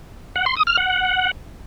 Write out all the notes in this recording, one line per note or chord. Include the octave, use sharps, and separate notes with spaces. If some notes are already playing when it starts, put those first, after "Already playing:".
F#5
C6
D#6
F6
F#5